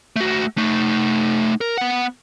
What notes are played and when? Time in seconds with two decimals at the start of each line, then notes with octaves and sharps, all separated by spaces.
0.16 A3 F#4
0.58 A3 D#4
1.61 A#4
1.78 B3 F#5